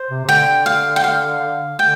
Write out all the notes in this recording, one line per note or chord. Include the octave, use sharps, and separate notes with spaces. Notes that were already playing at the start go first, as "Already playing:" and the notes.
Already playing: C5
C3
C3
D3 G5
F5
G5
F5
D3 G5